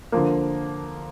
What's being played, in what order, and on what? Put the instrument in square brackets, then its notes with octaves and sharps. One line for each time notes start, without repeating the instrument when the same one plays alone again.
[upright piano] D3 F3 A#3